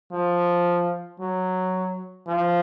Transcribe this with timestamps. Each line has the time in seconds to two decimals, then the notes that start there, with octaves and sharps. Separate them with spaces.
0.12 F3
1.20 F#3
2.28 F3